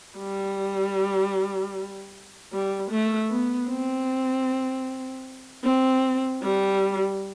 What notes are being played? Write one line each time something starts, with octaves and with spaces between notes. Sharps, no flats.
G3
G3
A3
B3
C4
C4
G3